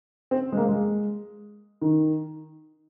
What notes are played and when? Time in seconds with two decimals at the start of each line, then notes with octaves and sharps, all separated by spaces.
0.31 C4
0.52 G#3
0.57 A#3
0.69 G#3
1.81 D#3